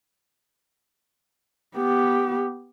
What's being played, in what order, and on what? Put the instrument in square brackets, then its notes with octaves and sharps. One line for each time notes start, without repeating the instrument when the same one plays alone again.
[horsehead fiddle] B3 G4